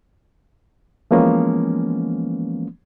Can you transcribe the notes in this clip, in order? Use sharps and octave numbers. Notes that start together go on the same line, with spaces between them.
E3 F3 G#3 A#3 B3 C#4